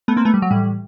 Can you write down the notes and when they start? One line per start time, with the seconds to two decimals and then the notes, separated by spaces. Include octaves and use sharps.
0.08 A3 B3
0.17 A#3 C4
0.25 A3 B3
0.34 G3
0.42 F#3
0.51 A2 E3 G3